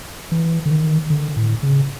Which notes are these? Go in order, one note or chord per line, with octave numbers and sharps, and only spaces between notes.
E3
D3
D#3
D3
A2
C#3